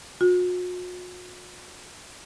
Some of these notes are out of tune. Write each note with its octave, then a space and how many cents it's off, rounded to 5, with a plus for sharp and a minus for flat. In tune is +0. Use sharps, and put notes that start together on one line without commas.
F#4 -45